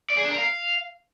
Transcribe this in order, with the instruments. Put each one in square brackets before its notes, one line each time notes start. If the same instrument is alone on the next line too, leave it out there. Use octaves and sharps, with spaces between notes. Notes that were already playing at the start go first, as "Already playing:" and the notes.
[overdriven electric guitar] D5
G#4
D4
A#4
F5